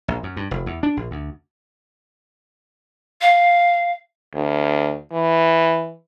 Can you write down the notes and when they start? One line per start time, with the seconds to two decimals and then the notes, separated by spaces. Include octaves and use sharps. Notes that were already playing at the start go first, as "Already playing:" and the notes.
0.08 A#1
0.23 F#2
0.37 G2
0.51 F1
0.66 E2
0.83 D4
0.97 A#1
1.11 D2
3.21 F5
4.35 D2
5.13 E3